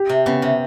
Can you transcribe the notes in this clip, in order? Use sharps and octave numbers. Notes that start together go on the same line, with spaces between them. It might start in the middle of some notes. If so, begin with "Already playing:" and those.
Already playing: G4
C3
C#3 B3
C3